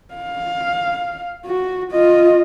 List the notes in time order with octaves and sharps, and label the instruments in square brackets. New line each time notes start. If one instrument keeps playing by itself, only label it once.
[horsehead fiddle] F5
F#4
F4 D#5